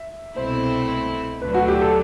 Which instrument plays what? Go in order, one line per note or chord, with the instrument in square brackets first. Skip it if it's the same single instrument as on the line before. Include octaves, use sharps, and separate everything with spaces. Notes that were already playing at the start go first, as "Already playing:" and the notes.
Already playing: [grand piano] E5
[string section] C2 B2 A3 C4 E4 [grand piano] C5
[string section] D2 D3 F#3 A3 D4 [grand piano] B4
[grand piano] F#4
G4
A4